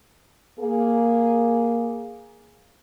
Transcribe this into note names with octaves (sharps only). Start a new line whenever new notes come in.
A#3 G#4